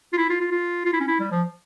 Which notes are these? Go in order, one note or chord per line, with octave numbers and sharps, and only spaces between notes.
F4
E4
F4
F4
F4
F4
E4
C#4
E4
G3
F3